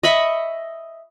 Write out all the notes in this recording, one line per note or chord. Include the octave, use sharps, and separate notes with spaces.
D#5 E5 B5 C#6